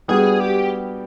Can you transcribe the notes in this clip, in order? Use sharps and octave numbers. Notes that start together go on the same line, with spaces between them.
G3 B3 D4 F#4 G#4
G4